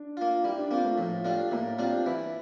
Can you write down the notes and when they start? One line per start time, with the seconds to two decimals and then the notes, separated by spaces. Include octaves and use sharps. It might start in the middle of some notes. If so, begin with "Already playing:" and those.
Already playing: D4
0.17 A#3 F4
0.43 G3 E4
0.58 D4
0.71 A#3 C4 F4
0.85 A3
0.98 A2 F3
1.24 G3 A3 D4 F4
1.51 A2 A#3
1.78 G3 C4 D4 F4
2.06 E3 E4